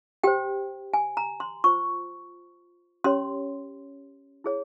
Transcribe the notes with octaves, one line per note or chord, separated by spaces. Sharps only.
G4 C5 G5
G#5
A#5
C6
F4 C5 C#6
C#4 G4 C#5 C6
E4 G#4 C#5